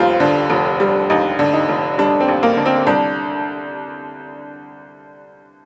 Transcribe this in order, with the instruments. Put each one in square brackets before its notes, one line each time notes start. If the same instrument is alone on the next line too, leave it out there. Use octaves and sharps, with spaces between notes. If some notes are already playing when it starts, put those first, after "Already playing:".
Already playing: [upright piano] F1 D#2 G3 F4 C5
D3
F1
G3
D#2 D#4
D3
D#4
F1
G3 D4
C4
D#2
A#3
D3
C4
C2 D4